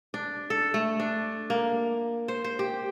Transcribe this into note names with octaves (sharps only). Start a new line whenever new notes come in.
D4
A4
A3
D4
A#3
C5
C5
G4